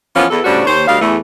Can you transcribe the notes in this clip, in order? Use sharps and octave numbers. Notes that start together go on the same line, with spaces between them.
E3 F3 A#3 B3 C#4 F4
E2 A4
A2 C#3 G3 D4 F#4 C5
D#2 C5 C#5
D2 G3 D#5 F5
E2 E3 A3